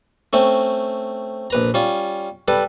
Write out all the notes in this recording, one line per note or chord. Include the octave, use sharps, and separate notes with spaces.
A3 C4 C#4
A#1 B4 A#5
G3 C#4 F4
G3 A4 B4